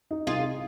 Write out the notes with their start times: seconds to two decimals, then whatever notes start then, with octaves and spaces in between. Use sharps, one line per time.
0.11 D#4
0.27 C2 F4 G#4